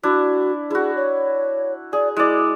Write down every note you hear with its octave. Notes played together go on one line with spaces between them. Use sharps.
D4 E4 F#4
E4 F#4 G#4
C#5
G#4 D5
G#3 E4 D5